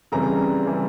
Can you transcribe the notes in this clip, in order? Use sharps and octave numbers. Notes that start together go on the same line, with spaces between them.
F2 C#3 E3 G3 A#5
C#3 E3 G3